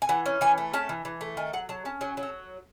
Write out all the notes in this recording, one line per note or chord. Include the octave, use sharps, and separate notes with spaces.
G#5
E3 F#5
C#4
E3 G#5
A3
C#4 A5
E3
E3
A3
D#3 G#5
F#3 F#5
F#3 A5
C#4 A5
F#3 G#5
F#3
A4